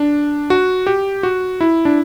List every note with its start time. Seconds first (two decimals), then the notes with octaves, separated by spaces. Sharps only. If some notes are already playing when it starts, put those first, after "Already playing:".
Already playing: D4
0.50 F#4
0.87 G4
1.23 F#4
1.61 E4
1.85 D4